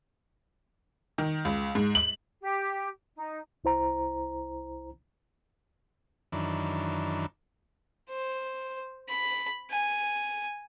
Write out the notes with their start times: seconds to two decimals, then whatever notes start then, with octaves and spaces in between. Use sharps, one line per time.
1.18 D#3
1.45 C#2
1.75 G#2
1.95 F#7
2.41 G4
3.16 D#4
3.64 C2 E4 C5 A#5
6.32 F#2 D#3 E3 D4
8.09 C5
9.08 B5
9.70 G#5